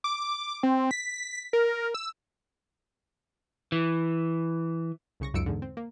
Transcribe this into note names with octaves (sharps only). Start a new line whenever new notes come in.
D6
C4
B6
A#4
E6
E3
C2 C#3 C#6 A#6
C#2 F#2 D#4 E6 C#7 D7
E2 G#2 D3
C4
A#3